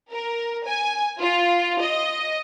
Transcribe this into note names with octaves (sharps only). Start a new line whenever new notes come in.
A#4
G#5
F4
D#5